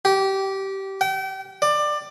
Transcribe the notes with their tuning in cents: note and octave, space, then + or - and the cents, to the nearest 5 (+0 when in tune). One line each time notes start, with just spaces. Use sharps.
G4 -20
G5 -35
D5 +20